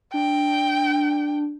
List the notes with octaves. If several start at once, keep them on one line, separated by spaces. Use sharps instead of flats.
D4 G5